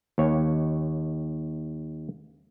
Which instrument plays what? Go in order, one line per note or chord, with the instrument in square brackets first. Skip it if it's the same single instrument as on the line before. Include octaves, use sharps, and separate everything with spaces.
[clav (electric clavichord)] D#2 C#5